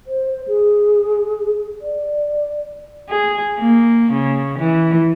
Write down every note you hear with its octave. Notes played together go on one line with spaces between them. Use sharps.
C5
G#4
D5
G#4
A#3
C#3
E3